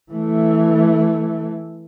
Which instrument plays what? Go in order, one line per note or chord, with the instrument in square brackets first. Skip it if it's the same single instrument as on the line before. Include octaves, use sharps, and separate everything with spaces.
[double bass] E3 A3